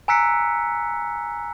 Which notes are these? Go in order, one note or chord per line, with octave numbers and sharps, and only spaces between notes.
G#5 A#5 E6 F#6 B6 C#7